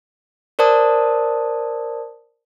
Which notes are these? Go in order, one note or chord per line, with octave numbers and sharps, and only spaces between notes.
A#4 C5 D5 A5 D#6